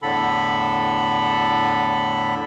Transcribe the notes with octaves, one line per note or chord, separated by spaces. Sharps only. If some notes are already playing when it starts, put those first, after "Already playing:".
E2 A2 D3 A4 B5